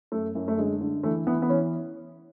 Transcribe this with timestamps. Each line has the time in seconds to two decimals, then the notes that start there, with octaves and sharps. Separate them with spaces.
0.12 F#2 A3
0.35 F#2
0.48 A3
0.58 D3 G#3
0.81 D3
1.04 E3 A3
1.26 E3 B3
1.42 B3
1.49 E3 C#4